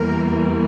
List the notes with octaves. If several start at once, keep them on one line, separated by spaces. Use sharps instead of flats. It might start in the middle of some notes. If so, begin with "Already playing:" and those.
Already playing: E2 E3 G3 A#3 A#4